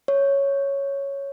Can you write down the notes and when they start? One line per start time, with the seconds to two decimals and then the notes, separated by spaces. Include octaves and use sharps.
0.08 C#5